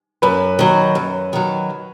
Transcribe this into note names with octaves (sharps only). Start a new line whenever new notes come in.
F#2 B4
D#3 F#3
F#2
D#3 F#3